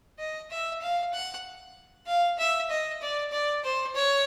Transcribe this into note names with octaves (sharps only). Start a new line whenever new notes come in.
D#5
E5
F5
F#5
F5
E5
D#5
D5
D5
C5
C#5